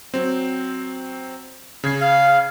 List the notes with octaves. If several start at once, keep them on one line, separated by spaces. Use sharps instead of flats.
F#3 C4
C#3 G#6 C7
F5